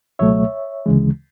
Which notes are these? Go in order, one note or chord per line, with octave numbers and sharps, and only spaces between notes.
C#2 B2 F#3 A3 C#5 E5
D2 C#3 E3 G#3